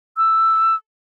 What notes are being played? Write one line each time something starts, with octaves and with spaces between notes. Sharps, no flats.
E6